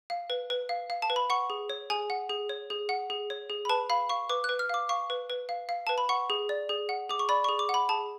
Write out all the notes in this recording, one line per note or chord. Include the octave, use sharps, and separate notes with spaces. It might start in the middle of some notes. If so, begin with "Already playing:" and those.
F5
B4
B4
F5
F5
A5
B4
B5
F#5 C#6
G#4
C#5
G#4 G#5
F#5
G#4
C#5
G#4
F#5
G#4
C#5
G#4
B5
B4 A5
F5 B5
F5 C#6
B4 D6
F#6
B4
F6
F5 D6
F5 C#6
B4
B4
F5
F5
B4 A5
B5
F#5 C#6
G#4
D5
G#4
F#5
G#4 D6
C#6
D5 B5
C#6
G#4
D6
F#5
B5
G#4 A5